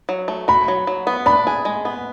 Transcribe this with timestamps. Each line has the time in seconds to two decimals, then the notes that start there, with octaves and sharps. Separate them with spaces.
0.09 F#3
0.28 A3
0.48 F#4 B5
0.68 F#3
0.87 F#3
1.07 B3
1.26 D4 B5
1.47 G#4
1.65 G#3
1.85 B3